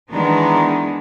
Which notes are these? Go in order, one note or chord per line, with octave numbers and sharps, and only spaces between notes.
D#3 E3 G#3 B3 D4 D#4